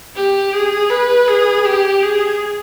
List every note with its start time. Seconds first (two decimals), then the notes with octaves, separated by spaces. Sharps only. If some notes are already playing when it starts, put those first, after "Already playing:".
0.16 G4
0.53 G#4
0.90 B4
1.28 G#4
1.65 G4
2.03 G#4